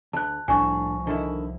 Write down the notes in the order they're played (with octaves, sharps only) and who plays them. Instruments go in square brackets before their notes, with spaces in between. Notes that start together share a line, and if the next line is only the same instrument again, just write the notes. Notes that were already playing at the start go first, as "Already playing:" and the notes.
[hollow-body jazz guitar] D2 [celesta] A5 F#6
[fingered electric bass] C2 F3 [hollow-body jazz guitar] A2 D4 [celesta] G#5 C#6
[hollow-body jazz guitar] D3 D#3 E4